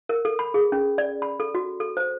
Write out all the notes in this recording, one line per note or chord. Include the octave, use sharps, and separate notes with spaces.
A#4
A4
B5
G#4
C#4
D5
B5
A4
F#4
A4
C5